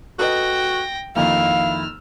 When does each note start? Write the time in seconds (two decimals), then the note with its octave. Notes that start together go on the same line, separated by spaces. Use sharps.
0.19 F#4 A4 B4 D#5 G5 A#6
1.16 F2 D#3 A#3 E4 F5 E6 F6